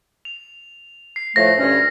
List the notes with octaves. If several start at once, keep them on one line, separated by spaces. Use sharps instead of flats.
F7
C7
A2 F3 A3 A#6
D2 G2 C#4